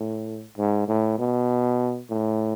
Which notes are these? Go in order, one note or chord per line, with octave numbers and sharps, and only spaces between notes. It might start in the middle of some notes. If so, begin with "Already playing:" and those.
Already playing: A2
G#2
A2
B2
A2